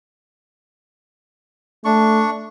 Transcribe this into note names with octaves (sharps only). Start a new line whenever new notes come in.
A3 D4 C#6